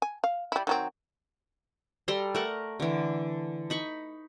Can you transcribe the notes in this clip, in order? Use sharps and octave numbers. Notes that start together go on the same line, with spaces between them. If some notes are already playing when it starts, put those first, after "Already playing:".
G#5
F5
G3 E4
D#3 F#3 C4
G3 A4 A#5 C6
A3 A#4 F#5
D3 E3
D#4 B5 C#6